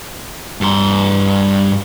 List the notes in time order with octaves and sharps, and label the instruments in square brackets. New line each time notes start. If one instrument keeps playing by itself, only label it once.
[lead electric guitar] G2 C6